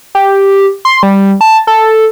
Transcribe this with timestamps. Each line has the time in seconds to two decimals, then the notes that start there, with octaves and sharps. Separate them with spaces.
0.15 G4
0.85 C6
1.03 G3
1.41 A5
1.67 A4